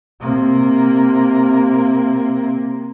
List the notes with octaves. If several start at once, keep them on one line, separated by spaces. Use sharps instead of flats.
C3 A#3